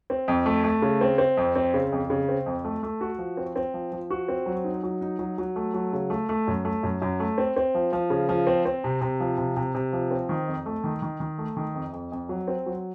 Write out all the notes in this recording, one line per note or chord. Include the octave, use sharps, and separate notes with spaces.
C4
F2
A3
A3
C#3
C4
C4
F2
C4
C#3
F2
C#3
C4
F2
A3
A3
F#4
F3
C4
C4
F3
F3
F#4
C4
F#3
D#4
F#3
D#4
F#3
F#3
A3
F#3
C#3
A3
A3
F#2
A3
F#2
F#2
A3
C4
C4
F3
F3
C#3
F3
C4
C4
C3
C3
F3
C3
C3
C3
F3
C4
D#3
F2
A3
D#3
D#3
D#3
A3
D#3
F2
F2
F2
F#3
C4
F#3